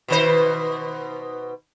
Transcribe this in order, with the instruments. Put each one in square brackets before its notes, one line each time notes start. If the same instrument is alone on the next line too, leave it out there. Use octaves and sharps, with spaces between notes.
[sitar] B2 D#3 C5